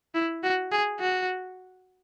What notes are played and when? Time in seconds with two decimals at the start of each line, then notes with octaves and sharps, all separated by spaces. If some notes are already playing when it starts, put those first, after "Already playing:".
0.15 E4
0.43 F#4
0.72 G#4
1.00 F#4